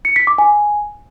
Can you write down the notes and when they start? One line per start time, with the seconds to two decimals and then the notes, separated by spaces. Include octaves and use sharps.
0.05 C#7
0.16 B6
0.27 D6
0.38 G#5